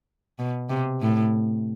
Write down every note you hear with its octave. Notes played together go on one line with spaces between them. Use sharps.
B2
C3
A2